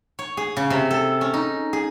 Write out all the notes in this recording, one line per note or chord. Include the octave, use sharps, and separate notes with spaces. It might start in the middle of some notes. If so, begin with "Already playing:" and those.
C#5
G#4
C#3
C3
A4
C#4
D#4
G#4